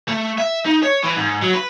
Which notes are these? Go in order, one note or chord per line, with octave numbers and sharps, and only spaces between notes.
A3
E5
D#4
C#5
E3
G#2
F#3
B4